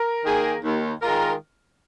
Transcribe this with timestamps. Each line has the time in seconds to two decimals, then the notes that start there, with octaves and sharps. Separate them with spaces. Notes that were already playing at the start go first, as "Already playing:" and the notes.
Already playing: A#4
0.25 D#3 A#3 G#4
0.63 D#2
1.02 D#3 G#3 F4 A#4